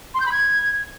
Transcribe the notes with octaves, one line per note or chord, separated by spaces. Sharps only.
C6
G6
B5
G#6